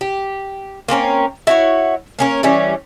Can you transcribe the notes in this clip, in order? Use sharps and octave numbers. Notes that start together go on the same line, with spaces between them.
G4
A#3 C4 C#4 A#4
E4 F#4 C#5
A#3 C#4 A#4
E3 G3 C#4